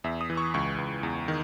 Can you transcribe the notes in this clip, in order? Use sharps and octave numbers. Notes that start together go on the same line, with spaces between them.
E2 E5
D#6
E3
C#6
C#2 C#6
C#2
E2
D#3